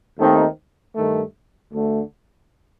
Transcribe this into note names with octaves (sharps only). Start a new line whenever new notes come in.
D#2 D#3 A3 C4 D#4
G2 D#3 A3
D2 D3 A3